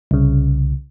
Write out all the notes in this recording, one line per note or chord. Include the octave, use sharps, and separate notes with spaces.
C2 C#3